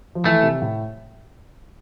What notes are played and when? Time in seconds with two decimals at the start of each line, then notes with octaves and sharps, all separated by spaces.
0.15 F3
0.25 E3 A3
0.43 C3
0.62 A2